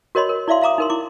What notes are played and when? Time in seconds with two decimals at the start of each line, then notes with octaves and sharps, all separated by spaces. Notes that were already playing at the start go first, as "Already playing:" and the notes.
0.15 F#4 A#4 C#5 D#5 B5 C6
0.29 A#4
0.48 E4 D5 E5 F5 C6
0.62 E5 F5 A#5 D6 D#6
0.78 D#4 A#4 C6
0.90 E4 D6